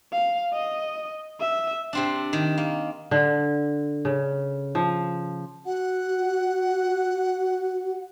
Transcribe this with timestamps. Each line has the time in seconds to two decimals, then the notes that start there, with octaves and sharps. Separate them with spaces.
0.13 F5
0.53 D#5
1.40 E5
1.93 C3 C4 D4
2.33 D#3
2.57 A#3
3.11 D3
4.05 C#3
4.75 F3
5.66 F#4 F#5